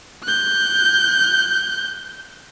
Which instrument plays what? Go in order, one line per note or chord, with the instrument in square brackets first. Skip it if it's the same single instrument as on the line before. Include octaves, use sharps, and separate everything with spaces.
[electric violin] F#6 G6